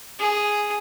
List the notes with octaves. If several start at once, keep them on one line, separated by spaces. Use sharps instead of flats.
G#4